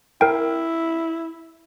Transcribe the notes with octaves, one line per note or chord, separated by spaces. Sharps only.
E4 A#4 G5